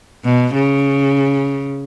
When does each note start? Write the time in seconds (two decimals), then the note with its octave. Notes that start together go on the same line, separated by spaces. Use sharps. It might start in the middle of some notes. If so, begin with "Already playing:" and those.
0.24 B2
0.54 C#3